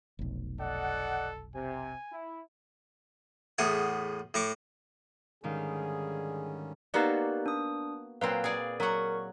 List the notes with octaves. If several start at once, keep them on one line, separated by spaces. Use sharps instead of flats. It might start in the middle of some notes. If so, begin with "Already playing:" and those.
F1 B1
A4 D5 D#5 F#5
C3 G#5
E4
E2 A2 G#4 F#5
A2 A#5 C#6 D6
G#2 D3 D#3 G3 C#4 G#4 F5
A#3 B3 D#4 F#4 G4 D5
D4 D#6
A#2 F#3 C4 B4 F5
G#4 D5
F#3 A#4 F#5 C#6